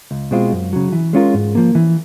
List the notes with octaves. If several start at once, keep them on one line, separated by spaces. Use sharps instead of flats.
C#2
B2 G#3 C4 F4
F#2
C#3 F#3
E3
G#3 C#4 F4 A#4
G#2
F3 A#3
E3